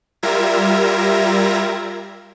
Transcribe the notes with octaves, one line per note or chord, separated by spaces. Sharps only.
G3 F4 A#4 E5 G#6 A#6